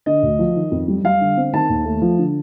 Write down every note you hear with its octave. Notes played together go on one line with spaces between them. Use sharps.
D3 D#5
D2
F3
D#3
F2
G3
G3 F5
D3
C4
D#3 A5
D#2
A3
F3
D3